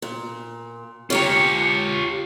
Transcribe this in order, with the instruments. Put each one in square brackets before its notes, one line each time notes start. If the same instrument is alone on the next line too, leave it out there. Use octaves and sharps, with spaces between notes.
[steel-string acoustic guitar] A#2
[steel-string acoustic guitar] C#4 G4 A#5 [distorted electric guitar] F4 C#5